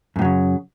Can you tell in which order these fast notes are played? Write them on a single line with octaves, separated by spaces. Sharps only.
F#2 A2 F#3 C#3